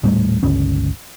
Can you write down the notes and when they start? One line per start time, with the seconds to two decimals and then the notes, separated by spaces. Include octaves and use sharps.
0.03 D#1 A2 G3 A3
0.43 G1 C#2 C#4